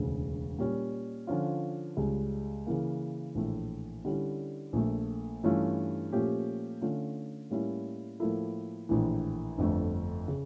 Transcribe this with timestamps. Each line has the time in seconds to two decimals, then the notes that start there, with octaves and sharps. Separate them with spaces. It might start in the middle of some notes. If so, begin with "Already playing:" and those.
Already playing: E1 D2 C#3
0.59 A#2 G3 C#4
1.27 D3 F3 C#4 F4
1.97 C#2 C#3 G3
2.67 C#3 E3 A#3
3.35 A#1 A2 E3 A3
4.05 D3 G3 C#4 E4
4.73 A#1 A#2 A3
5.43 G2 E3 A3 C#4 F4
6.12 A#2 F3 A3 C#4 G4
6.81 D3 A3 C#4 F4
7.50 A2 G3 A#3 C#4 E4
8.20 A2 F3 A#3 E4 A4
8.89 A#1 A2 E3
9.58 G1 F2 D3 A3
10.28 C#3